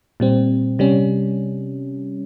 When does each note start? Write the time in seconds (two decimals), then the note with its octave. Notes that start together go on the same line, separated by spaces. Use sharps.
0.20 A#2 G3 C4
0.79 C3 G3 C#4